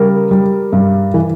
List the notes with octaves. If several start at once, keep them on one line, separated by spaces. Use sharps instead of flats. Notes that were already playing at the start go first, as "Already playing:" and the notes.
Already playing: C#3 G3 A#4
G3
G2
E3